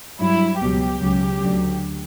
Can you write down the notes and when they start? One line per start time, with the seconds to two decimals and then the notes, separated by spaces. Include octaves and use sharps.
0.19 G2 F#3 E4
0.60 C#2 B2 F#3 G4
1.01 C#2 C#3 F#3
1.41 D2 D3 F#3